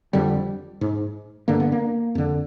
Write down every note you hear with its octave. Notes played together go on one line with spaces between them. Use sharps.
F2 D3 G3
G#2
G2 D3 A#3
B3
A#3
F2 D3